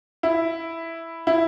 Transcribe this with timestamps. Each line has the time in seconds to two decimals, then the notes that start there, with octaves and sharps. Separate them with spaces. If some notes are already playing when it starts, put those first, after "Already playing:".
0.23 E4
1.27 E4